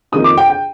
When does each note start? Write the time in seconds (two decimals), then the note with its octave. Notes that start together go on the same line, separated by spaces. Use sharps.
0.12 F2 D#3 A#3 D#4 D#6
0.24 D6
0.38 G5
0.50 G5